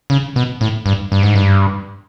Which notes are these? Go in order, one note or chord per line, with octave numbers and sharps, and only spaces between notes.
C#3
B2
A2
G2
G2
G#2
G2